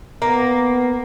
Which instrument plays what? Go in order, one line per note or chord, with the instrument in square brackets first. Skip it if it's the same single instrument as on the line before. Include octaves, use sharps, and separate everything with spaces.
[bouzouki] A#3 [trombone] B3